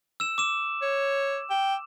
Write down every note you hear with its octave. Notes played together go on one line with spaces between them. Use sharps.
E6 E7
D6 E7
C#5
G5